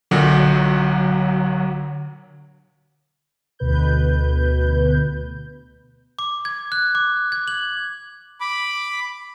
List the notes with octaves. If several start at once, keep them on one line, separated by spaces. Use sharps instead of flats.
B1 A#2 D3 F#3 F#4
D2 B2 B4 G6
D6
G#6
F#6
D6
G#6
F#7
B5 D6